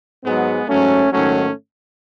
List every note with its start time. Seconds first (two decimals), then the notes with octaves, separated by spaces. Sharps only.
0.24 G#2 F#3 G#3 B3
0.68 G#2 F#3 A3 C#4
1.12 G#2 D#3 F#3 A3 C#4